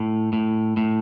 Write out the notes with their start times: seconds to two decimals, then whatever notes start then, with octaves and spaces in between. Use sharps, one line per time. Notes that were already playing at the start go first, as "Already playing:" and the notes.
Already playing: A2
0.33 A2
0.77 A2